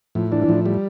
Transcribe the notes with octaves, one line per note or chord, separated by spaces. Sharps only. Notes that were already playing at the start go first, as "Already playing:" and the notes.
A2 F3
E3 D4
E3
A2 F3
G3